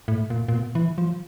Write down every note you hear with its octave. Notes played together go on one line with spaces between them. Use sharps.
A2
A#2
A#2
B2
E3
F3